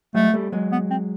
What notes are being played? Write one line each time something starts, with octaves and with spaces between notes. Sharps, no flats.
F#3 G#3 A3
G3 A3
F#3 G#3
B3
C4